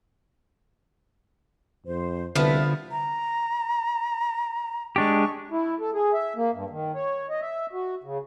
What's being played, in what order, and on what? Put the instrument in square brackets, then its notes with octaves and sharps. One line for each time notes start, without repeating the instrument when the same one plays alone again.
[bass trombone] F2 [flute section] C5
[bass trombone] C2 [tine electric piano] D3 [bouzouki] F3 B3 [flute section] B4 E5
[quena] A#5
[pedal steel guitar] G#3 D4 G4 [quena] C#6
[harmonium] E4
A4
G#4
E5
A#3
G2
D#3
C#5
D#5
E5
F#4
C#3